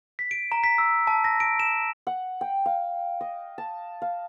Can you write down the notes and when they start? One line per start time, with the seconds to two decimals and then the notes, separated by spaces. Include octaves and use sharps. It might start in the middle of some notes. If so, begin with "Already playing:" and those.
0.19 B6
0.31 D7
0.52 A#5
0.64 B6
0.78 E6
1.07 A5
1.24 A#6
1.40 D7
1.60 E7
2.07 F#5
2.41 G5
2.66 F5
3.21 D#5
3.58 A5
4.02 F5